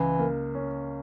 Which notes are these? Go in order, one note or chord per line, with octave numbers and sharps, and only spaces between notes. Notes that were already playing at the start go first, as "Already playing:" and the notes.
Already playing: C#2 E3
A#3
C#4